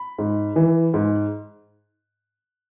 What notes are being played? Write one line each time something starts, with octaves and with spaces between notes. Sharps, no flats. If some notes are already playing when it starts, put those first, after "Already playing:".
Already playing: B5
G#2
E3
G#2